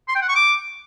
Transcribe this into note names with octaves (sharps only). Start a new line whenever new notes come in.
C6
G5
F#5
C#6
D6